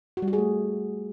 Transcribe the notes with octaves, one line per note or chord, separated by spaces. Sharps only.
F#4
G3
F#4
G#4
A3